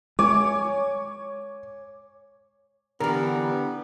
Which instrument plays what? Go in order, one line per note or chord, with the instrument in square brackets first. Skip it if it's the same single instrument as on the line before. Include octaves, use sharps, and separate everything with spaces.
[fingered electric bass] G#3 [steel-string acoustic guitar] C#5 G#5 [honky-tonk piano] D6
[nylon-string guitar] D3 E3 [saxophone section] B3 G4 [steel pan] A#4